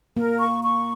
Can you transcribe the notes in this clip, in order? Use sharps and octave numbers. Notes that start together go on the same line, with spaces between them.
A#3 A#4
C#6
C#6